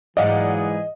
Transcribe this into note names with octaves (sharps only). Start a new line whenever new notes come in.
G#2 E3 F#3 G#4 D5 D#5 F5 F#5